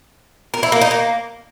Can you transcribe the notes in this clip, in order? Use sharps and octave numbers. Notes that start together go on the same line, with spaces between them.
A#4
E4
A#3
D#4
A#3